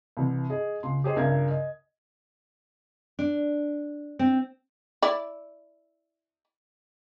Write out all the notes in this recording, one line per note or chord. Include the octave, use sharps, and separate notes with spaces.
C2 E3
G#4 D#5
C#2 C6
G4 G#4 C5 D#5
C#2 G2 A#4 E5 G#6
D#5
D4
C4
E4 D5